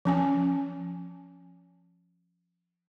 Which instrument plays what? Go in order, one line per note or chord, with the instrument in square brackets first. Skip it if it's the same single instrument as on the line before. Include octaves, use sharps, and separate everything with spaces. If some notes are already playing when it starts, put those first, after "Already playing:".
[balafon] F3 C#4 G#5